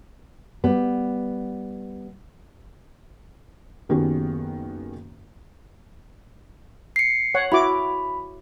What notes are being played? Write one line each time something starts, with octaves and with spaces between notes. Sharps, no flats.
G3 B3
F#1 D#3 B3 C#4 F#4 G4
C7 C#7
C#5 F#5
E4 F#4 B5 D6